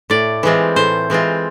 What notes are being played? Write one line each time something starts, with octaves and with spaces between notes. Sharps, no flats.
A2 D5
E3 G#3 C4 F4
A2 C5
E3 G#3 C4 F4